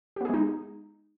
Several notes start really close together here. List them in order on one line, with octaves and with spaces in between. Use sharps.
G4 B3 G#4 G#3 D#4